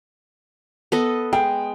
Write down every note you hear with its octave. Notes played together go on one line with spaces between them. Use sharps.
B3 A4 D#5
G#3 G5